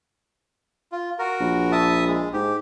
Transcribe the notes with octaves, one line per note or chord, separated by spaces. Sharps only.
F4
F#4 A#4
A#1
E5 A5 D#6
G#3
G#2 G4